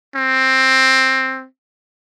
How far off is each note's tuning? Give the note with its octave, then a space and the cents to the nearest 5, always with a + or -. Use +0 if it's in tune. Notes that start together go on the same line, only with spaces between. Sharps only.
C4 +10